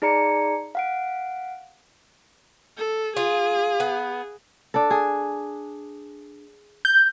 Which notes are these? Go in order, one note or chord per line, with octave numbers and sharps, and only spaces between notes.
D#4 G#4 D5 A#5 C#7
F5 F#5 D7
A4
F4 G#4
B3
D4 A4
G#4
G6